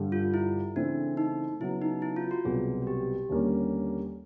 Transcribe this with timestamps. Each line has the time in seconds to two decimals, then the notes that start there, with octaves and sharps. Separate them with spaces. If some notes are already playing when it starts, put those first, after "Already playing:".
Already playing: G2 D3 G3
0.12 F4
0.34 E4
0.75 C#3 E3 A3 C4 D4 E4
1.17 D#4
1.60 C#3 F#3 B3 E4
1.82 D#4
2.02 E4
2.16 F4
2.31 F#4
2.44 C2 B2 F#3 B3 G#4
2.82 F#4
2.87 G4
3.29 D#2 D3 G3 A#3 C#4